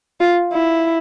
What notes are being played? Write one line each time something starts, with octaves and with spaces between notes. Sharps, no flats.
F4
E4